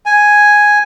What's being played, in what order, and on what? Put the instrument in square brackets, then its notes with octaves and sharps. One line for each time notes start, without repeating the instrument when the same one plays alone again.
[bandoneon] G#5